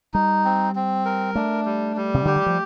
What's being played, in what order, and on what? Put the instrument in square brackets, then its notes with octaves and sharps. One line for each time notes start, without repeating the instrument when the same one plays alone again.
[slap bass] G3 [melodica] D#4
[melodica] C4
C4
A#4
[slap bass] A3 [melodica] D4
[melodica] G3
G3
[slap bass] C3
[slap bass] D3 [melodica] G4
[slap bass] D#3
F3